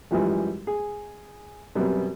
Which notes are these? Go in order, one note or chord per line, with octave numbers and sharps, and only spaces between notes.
F#2 E3 F3 G3 G#3
G#4
F#2 B2 G3 B3 C4